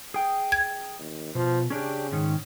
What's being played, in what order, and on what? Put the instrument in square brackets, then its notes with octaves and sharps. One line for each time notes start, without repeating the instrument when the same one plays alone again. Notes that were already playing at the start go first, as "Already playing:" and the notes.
[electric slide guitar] G#4 G5
[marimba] G#6
[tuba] D#2
[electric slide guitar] B2 [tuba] F3
[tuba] C#3 [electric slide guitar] C#4 D4 G4
[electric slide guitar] G#2 D#3 C#4